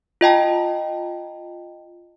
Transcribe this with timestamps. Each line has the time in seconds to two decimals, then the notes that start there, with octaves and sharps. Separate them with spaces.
0.21 F4 D#5 G5 A5